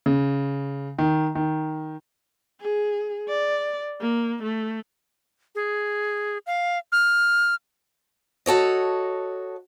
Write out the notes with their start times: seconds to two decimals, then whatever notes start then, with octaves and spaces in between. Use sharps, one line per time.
0.06 C#3
0.99 D#3
1.35 D#3
2.61 G#4
3.28 D5
4.00 A#3
4.43 A3
5.55 G#4
6.46 F5
6.92 F6
8.46 F#4 A4 C#5 D#5